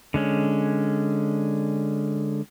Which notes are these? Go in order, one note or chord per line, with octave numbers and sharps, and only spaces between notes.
D3 G#3 C#4